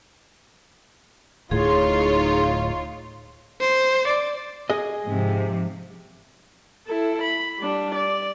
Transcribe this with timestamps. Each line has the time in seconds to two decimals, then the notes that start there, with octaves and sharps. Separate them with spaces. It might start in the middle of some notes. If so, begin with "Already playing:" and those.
1.51 D1 A2 D#4 F4 G#4 C#5 C6
3.61 C5
4.07 D5
4.70 G#4 D#5
5.07 G#2 C3 F3
6.87 E4 A4
7.23 B5
7.59 G3 D4
7.95 D5